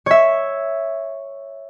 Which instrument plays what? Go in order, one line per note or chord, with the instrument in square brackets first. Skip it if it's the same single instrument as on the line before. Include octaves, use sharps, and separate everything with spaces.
[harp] C#5 E5